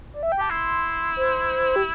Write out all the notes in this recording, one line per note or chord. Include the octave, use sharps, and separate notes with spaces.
D5
E5
G5
G4 A5
E4 C6
C5
G4